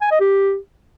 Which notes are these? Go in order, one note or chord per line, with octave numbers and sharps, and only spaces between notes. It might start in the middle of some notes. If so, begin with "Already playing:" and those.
G#5
D#5
G4